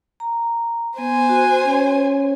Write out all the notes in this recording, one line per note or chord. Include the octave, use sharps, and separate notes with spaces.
A#5
B3 C5 G#5
F#4
C#4 C#5